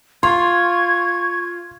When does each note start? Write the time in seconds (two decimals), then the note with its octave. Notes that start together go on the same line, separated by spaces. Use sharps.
0.23 F4 C6 C#6 G#6